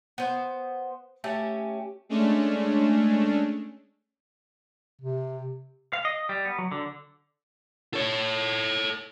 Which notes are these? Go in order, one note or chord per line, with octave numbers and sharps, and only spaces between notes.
B3 C5
A3 C#4 G4
G#3 A3 C#4 D4
C3
F5
D#5
G3
B3
F#3
D3
A4 C#5